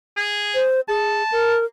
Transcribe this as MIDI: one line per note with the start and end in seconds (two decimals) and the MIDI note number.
0.17 0.63 68
0.55 0.81 72
0.88 1.23 68
0.88 1.55 81
1.32 1.65 70